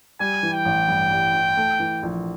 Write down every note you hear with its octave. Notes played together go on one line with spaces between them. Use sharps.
G3 G#5
E3
G5
A1
G2
G3
E3
A3
E3
A#1